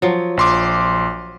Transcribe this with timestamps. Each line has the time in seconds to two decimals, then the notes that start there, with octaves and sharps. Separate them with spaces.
0.02 F3 F#3
0.37 A#1 C6 D6